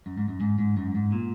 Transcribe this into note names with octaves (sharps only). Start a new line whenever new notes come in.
F#2
G#2
F#2
G#2
G#2
F#2
G#2
A#2